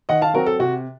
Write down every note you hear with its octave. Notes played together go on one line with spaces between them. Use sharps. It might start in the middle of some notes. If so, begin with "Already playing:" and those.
D#3 D#5 F#5
F5 A5
F#3 C4 F#4 A#4
A4
C3 F#4